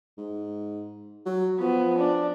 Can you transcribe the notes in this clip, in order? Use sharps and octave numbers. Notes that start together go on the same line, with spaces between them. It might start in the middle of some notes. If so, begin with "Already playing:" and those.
G#2
F#3
F3 B3
D4